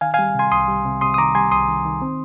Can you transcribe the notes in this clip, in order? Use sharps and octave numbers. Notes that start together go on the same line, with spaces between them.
D#3 F5 G#5
G3 F5 G#5
C3 G#5 C6
C2 C6 D#6
G3
C3
C3 C6 D#6
D#6
D#3 A#5 D6
G3 G#5 C6
C2 C6 D#6
D#3
D#3
C4